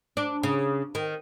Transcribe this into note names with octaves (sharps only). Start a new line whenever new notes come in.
D4
C#3
D#3